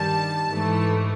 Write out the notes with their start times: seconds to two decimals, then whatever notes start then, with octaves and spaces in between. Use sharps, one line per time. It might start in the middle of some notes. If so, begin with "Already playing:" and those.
Already playing: G2 D#3 G3 A5
0.49 G#2 E3 A3